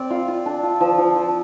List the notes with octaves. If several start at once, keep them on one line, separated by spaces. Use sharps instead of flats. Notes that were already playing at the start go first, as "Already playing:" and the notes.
Already playing: C4 D5
F4
F4
D4
F4
F3
F3
F3